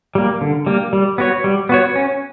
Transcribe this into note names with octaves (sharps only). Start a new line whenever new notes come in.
G3 A#3
D3
G3 A#3
G3
B3 F#4 C#5
G3
B3 F#4 C#5
C#4